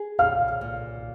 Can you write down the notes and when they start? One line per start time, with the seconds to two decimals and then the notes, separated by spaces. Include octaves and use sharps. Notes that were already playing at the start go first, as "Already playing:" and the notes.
Already playing: G#4
0.19 A#2 F5 F6
0.61 A#2